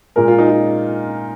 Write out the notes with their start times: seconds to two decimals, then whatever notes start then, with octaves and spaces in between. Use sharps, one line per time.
0.16 A#2 G#3 A#4
0.28 F4
0.38 D#4
0.50 F4